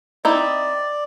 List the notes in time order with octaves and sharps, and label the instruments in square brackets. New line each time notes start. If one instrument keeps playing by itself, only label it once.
[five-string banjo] C4 D#4 E4 [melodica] D5